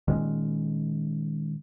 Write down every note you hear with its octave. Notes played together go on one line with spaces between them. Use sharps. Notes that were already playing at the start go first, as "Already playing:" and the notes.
A#2 D#3 G#3 C#4